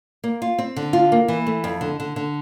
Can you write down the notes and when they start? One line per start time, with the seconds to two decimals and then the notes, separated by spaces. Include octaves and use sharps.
0.24 A#3
0.42 F4
0.58 C4
0.76 D3
0.93 F4
1.12 A#3
1.28 E3
1.47 A3
1.64 F2
1.81 D3
2.00 D3
2.16 D3